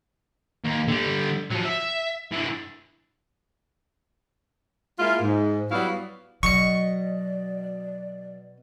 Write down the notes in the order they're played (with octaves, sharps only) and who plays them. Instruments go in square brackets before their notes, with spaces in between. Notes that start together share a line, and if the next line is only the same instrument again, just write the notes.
[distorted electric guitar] D#2
D3 G3
F3 F#3
E5
E3 D4
[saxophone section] G#3 A#3 E4 F4
G#2
F#3 G3 B3 E4 F#4 F5
[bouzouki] B2 D#5 [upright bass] F#3 [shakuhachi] D5 [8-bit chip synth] C#6 C#7